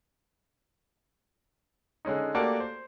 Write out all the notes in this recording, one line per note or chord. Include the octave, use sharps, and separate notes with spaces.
D3 G#3 C#4 D#4
A3 A#3 F#4 G4 A4 D5
C5